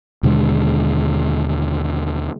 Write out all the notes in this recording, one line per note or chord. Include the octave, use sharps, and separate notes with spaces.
D#2 B2 D3 G#3